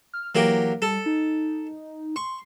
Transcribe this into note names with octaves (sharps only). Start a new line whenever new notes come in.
F6
E3 F#3 A#3 G4
G3 A4
D#4
C6 C#6